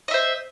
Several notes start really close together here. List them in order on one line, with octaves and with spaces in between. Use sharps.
D#5 E5 C5